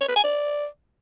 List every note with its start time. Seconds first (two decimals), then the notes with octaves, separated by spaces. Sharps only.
0.01 C#5
0.08 B4
0.16 G#5
0.24 D5